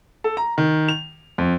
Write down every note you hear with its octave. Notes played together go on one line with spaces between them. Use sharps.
A4
A#5
D#3
F7
F2